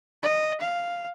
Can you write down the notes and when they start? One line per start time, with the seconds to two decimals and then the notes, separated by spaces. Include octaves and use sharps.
0.23 D#5
0.61 F5